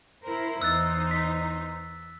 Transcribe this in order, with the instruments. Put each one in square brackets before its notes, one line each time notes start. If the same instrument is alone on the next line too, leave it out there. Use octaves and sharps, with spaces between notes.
[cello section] E4 A#4 C5
[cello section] E2 D#4 C5 [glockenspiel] E6 F#6 A6
[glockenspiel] B6